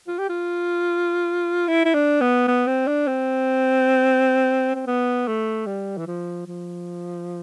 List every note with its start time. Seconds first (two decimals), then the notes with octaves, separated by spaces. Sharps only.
0.08 F4
0.19 G4
0.30 F4
1.68 E4
1.85 E4
1.94 D4
2.21 B3
2.48 B3
2.67 C4
2.87 D4
3.08 C4
4.75 C4
4.87 B3
5.28 A3
5.66 G3
5.98 E3
6.07 F3
6.47 F3